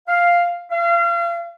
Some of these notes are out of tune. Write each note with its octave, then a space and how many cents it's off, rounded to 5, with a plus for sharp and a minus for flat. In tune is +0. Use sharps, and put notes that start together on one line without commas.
F5 +0
F5 -35